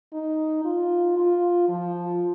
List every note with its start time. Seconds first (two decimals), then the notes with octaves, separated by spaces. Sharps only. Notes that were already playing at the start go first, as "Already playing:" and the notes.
0.13 D#4
0.65 F4
1.16 F4
1.69 F3